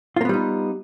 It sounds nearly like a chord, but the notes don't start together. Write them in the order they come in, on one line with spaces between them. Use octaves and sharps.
F4 A#3 B3 G3 D#4